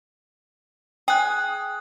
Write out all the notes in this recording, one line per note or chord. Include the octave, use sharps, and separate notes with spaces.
G#4 G5 F#6